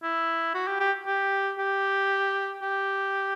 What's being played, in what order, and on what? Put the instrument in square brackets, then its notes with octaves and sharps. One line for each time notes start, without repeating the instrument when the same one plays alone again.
[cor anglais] E4
F#4
G4
G4
G4
G4
G4